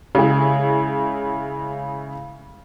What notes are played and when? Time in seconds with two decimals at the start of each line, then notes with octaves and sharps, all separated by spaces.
0.15 C#3 G#3 E4 G#4